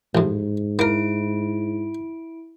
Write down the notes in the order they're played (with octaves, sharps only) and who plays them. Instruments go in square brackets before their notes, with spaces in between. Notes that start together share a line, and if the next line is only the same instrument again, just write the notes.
[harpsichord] A1 F2 [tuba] G#2
[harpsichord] A#3 A#4 [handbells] E4 D7